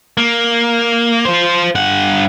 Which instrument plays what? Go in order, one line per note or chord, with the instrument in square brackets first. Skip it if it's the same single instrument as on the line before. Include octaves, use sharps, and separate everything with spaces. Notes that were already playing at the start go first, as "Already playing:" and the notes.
[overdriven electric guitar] A#3
F4 C5
G2 F#5